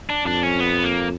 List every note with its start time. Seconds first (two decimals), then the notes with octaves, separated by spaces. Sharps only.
0.10 D4
0.26 F2 D4
0.43 C#4
0.60 B3
0.84 A#3